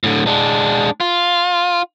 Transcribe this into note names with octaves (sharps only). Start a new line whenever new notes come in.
A2 D3
G#3 D4
F4